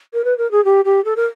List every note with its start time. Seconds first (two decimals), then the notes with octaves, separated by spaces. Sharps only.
0.13 A#4
0.24 B4
0.37 A#4
0.51 G#4
0.64 G4
0.85 G4
1.04 A4
1.16 A#4